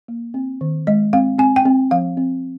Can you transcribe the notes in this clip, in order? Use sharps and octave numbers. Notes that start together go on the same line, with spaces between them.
A#3
C4
D#3
G#3 D#5
C4 F5
C4 G#5
G5
C4
F3 F5
C4